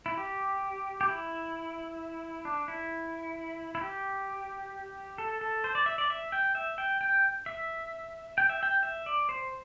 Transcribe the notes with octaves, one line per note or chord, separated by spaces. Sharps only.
E4
G4
G4
E4
D4
E4
E4
G4
A4
A4
C5
D5
E5
D5
E5
G5
E5
G5
G5
E5
G5
E5
G5
E5
D5
C5